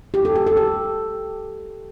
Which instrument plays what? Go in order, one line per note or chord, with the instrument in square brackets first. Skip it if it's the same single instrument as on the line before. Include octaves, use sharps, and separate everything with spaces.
[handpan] G4
A4
G4
A4
G4